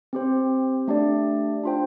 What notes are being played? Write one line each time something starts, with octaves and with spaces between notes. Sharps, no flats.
C4 G4 C5
A3 D4 G4 D5
D4 F4 C5 G5